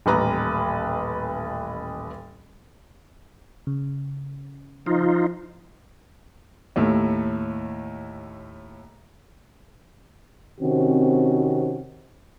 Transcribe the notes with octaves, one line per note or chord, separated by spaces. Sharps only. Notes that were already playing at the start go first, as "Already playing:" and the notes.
D#1 A1 B4 A#5
C#3
F3 D#4 F4
D#2 A2
C3 D#3 C4 C#4 F#4